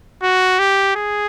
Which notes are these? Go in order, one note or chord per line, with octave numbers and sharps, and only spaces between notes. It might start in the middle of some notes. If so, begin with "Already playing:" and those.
F#4
G4
G#4